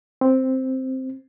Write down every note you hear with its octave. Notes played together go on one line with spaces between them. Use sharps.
C4